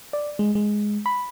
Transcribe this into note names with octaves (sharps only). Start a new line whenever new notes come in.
D5
G#3
G#3
B5